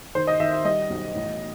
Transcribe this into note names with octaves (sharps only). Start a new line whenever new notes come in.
D#3 C5
D#5
D#3 E5
E5
G3 D#5
B1
A1